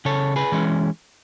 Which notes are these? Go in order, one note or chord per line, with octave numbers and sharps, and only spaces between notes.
C#3 A4 C#5
G#4 B4
E3 G#3 C#4